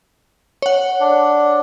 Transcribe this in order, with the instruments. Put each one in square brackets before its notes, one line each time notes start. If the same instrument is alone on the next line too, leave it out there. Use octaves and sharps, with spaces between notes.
[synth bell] C#5 F#5
[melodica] D4